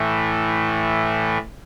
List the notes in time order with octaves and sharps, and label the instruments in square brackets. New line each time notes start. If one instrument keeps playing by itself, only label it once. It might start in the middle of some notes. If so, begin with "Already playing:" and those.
Already playing: [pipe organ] A2 E3 A3